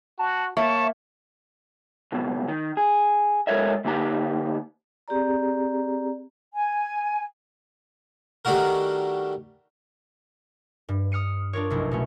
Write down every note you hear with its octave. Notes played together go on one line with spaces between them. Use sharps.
F#4 A5
A#3 C#5 E5 A5
C#2 F#2 B2
D#3
G#4
G#3 A4 A#4 C#5 D#5 E5
D3 A#3 D#4 G4 A#5
C4 G4 G#4 D5 A#5
G#5
D#3 G3 A3 D4 F#4 A#4
G2
D#6 F6 C#7 D#7
D4 F4 A#4 C#5
F1 B1 E4
B2 A3 C#4